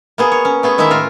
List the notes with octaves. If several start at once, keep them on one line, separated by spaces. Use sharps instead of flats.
A#3 B3 G#4
C#5
C#4
A3 B3 G#4
D#3 G#3 A#3 E4 E5
A2 F4 A#4